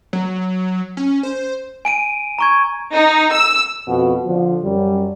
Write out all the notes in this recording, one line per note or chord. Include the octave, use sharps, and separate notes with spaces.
F#3
C#4
C5
G#5 D7 D#7
A#5 C#6 G#6
D#4
E6
F2 B2 F#4
D3 F3
F#2 G3